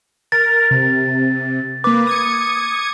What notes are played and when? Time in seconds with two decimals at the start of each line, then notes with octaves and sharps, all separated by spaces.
0.32 A#4 A6
0.71 C3
1.84 A#3 B4 D6
2.07 D#6 G#6 C#7